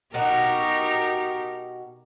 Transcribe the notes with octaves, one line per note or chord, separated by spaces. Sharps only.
B2 D#4 F#4 G4 A#4